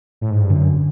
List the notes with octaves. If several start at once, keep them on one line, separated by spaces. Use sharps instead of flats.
A2
G#2
G2
F#2 D3